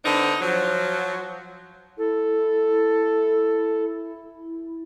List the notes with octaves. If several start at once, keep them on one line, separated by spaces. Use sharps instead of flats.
D3 B3 C4 D4 D#4
F3 F#3
E4 A4